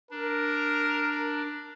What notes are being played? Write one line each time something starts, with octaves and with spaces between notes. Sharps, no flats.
D4 A#4